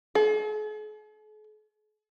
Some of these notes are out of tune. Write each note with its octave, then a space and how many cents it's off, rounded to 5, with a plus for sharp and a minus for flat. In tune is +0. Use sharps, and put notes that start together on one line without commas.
G#4 +45